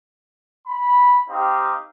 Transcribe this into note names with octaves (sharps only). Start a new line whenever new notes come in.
B5
C4 D#4 G4 F5 D6